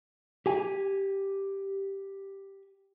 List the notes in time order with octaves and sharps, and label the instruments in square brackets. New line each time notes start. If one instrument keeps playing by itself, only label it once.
[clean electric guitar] G4 G#5